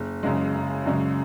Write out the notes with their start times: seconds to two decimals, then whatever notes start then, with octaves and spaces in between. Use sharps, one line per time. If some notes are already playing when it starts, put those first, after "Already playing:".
Already playing: F#1
0.23 F#2 C#3 G#3
0.55 F#1
0.86 F#2 C#3 G#3